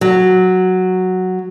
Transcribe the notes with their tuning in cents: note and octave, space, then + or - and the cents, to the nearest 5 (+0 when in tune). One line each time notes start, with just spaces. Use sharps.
F#3 +0